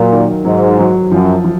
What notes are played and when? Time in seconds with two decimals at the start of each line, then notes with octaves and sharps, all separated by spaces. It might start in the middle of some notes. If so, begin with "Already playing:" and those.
Already playing: A#2 F#3
0.12 D#3
0.45 G#2 F#3
0.79 F#3
1.11 F#2 F3
1.44 F3